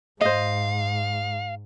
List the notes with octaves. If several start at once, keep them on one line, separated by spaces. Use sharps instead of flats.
G#2 C5 D#5 F5